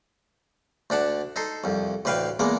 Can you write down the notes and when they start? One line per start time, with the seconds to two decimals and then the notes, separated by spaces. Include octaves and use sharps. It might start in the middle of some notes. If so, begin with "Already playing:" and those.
0.90 D2 D4 F#5 A5
1.36 D#4 A4 C6
1.64 C2 F2
2.05 A1 D2 B4 F5 G5
2.40 E2 G#3 A#3 B3 D6